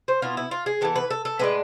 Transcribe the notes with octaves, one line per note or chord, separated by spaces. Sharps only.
C5
B2 B3 E4 F4
E4
F4
G#4
E3 G#3 B3 A4
B4
A4
A4
A2 G#3 D4 B4